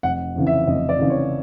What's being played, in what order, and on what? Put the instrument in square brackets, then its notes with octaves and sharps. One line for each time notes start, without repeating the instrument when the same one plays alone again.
[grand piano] F1 F#5
F2 C#3 E3
E5
F1 D#5
D5
F2 C#3 E3
C#5